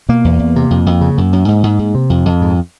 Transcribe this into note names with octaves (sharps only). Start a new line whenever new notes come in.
B2 A#3
E2
E2
C3
F2
F2
C#3
F#2
F#2
G#2
G#2
G#2
C3
F2
F2
G#2